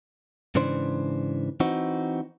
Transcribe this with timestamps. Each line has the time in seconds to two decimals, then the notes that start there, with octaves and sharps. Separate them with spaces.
0.55 G#2 C#3 E3 D4 C5
1.60 E3 C4 D#4 F#4